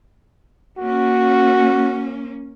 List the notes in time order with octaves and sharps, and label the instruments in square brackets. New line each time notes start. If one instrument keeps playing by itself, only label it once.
[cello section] A#3 C#4 [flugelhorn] F#4